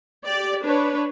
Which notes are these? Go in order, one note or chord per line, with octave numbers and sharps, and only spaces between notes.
G4 D5
D4 B4 C#5